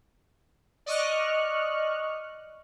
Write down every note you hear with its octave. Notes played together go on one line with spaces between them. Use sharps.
D5 D#5 C#6 F6 F#6